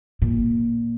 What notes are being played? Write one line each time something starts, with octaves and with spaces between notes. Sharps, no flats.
A#2